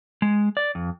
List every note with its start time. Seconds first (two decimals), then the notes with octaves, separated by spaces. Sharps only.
0.22 G#3
0.57 D5
0.75 F2